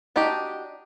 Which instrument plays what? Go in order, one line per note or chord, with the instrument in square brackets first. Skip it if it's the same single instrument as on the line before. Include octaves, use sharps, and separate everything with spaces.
[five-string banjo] D4 D#4 F#4 G4